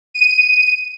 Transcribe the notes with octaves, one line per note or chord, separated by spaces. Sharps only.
D#7